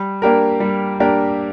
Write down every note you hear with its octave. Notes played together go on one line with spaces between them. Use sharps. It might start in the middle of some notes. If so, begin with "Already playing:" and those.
Already playing: G3
A#3 D4 G4 A#4
G3
A#3 D4 G4 A#4